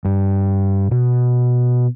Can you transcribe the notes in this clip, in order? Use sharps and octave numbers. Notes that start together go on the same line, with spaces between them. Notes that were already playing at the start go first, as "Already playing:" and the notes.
G2
B2